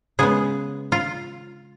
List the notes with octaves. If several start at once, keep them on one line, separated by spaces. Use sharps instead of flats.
C#3 G#3 B3 G#4
F4